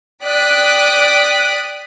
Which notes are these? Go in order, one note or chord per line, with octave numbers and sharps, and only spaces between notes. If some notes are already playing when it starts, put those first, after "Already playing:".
D5 G5 D#6 F#6 B6 D7